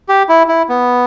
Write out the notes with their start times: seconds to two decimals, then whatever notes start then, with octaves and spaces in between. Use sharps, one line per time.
0.09 G4
0.29 E4
0.48 E4
0.69 B3